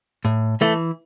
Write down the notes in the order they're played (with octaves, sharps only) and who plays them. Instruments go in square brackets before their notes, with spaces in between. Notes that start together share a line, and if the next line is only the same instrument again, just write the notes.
[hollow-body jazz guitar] A2
E3 A3